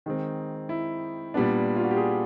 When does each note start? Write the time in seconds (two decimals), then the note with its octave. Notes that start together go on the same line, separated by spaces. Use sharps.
0.06 D#3 G#3 C4 D#4
0.69 E4
1.34 A#2 G3 B3 D4
1.76 F4
1.84 F#4
1.91 G4
1.97 G#4